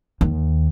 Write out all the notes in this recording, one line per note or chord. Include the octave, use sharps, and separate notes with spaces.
D#2